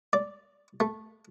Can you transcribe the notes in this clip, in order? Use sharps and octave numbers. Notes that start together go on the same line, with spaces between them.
D5
A3